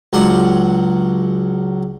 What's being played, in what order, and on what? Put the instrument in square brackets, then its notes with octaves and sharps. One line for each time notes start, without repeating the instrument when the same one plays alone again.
[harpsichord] C#2 F#3 D4 F#5 C6